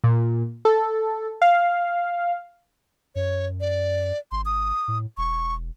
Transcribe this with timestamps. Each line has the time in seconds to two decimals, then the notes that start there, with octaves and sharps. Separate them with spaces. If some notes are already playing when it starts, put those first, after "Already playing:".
0.04 A#2
0.65 A4
1.42 F5
3.15 F#2 C#5
3.60 D5
4.32 G#1 C6
4.45 D#6
4.88 A2
5.17 E1 C#6